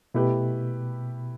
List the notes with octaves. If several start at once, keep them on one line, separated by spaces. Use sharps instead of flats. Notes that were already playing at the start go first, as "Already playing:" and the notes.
B2 A3 E4 G4 B4